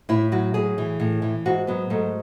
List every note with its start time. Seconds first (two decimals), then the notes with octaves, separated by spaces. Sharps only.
0.09 A2 E4
0.32 F#3 F#4
0.54 A2 G#4
0.78 E3
1.00 A2
1.22 E3
1.46 G#2 F#4
1.67 F#3 B3
1.90 G#2 A3